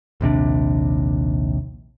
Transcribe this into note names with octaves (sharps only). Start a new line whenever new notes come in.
A#1 D#2 C3 D4